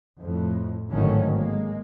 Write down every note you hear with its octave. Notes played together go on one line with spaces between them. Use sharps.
F2 A2
G#1 A2 D3 D#3 F#3 C#4
G#3 A#3